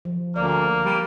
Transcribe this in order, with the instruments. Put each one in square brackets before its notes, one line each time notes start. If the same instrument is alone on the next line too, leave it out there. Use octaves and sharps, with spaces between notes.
[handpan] F3
[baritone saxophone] D2 [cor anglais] A#3 [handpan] D5
[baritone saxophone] G3